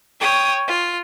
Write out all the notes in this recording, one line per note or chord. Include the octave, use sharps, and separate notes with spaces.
C#5 G5 D#6
F4